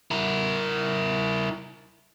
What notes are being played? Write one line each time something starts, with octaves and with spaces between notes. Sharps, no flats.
E4 A#4